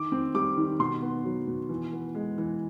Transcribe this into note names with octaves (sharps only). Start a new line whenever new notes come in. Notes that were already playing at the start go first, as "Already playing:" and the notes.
Already playing: D#3 D6
C4
G3 D6
D#3
B2 C6
B3
F#3
B2
E3
B3
G#3
E3